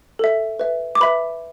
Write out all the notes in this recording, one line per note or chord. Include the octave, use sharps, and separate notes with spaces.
A4 E5
B4 E5
D6
B4 E5 B5